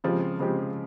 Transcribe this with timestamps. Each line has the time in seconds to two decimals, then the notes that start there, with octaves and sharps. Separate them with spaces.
0.04 C#3 F3 G#3 C4 G4
0.39 C#3 F3 G#3 C4 G4